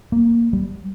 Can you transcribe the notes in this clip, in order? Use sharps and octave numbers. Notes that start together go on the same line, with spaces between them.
A#3
G3